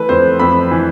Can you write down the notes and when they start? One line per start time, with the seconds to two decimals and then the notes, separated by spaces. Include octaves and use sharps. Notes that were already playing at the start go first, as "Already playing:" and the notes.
Already playing: E3 A3 B4
0.09 F2 C5
0.39 F2 B5
0.71 E3